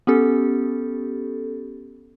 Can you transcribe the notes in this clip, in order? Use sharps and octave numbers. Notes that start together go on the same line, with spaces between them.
B3 C#4 G4 A4